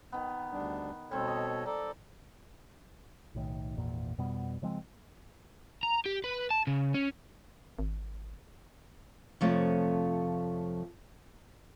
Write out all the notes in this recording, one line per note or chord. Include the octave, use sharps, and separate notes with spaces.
D#3 B3
D2 G3 D4
B2 G3 C4 A4 C#5
D#5
A4 D5 A#5
B1 A2 D#3
G#1 E2 A#2
F2 B2 G3 B3
C#3 F3 G#3 C4
A#5
G4
B4
A5
C#3
C#4
G#1
F2 C3 F3 A3 C#5